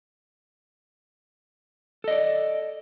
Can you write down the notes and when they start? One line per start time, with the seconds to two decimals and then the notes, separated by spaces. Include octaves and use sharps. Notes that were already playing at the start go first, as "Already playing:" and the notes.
2.04 A4
2.08 D#5
2.11 D5